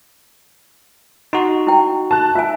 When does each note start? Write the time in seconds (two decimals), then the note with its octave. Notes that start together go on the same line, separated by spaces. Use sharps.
1.33 D#4 F#4 C6
1.67 E4 G5
2.11 A5 F#6
2.35 F4 E5 G#5